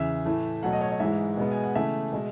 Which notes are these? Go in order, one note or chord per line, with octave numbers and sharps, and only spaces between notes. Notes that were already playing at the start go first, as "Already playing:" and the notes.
Already playing: E2 C#3 E3 E5
A2 E3 A3
B2 F#3 A3 F#5
D#5
C#5
D#5
G#2 E3 G#3 E5
B2 G#3 B3
G#5
F#5
C#3 E3 A3 E5
B2 G#3